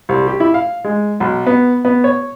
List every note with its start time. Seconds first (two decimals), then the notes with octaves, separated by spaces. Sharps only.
0.09 C2
0.27 G4
0.40 E4
0.54 F5
0.84 G#3
1.20 B1
1.47 B3
1.85 B3
2.04 C#5